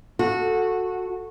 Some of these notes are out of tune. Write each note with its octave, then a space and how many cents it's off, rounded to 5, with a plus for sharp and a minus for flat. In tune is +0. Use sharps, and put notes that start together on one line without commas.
F#4 -15 A4 +0